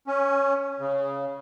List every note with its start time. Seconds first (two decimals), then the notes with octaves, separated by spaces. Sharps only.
0.07 C#4
0.79 C#3